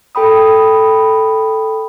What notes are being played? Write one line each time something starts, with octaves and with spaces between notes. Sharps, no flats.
A4 G5 B5 D#6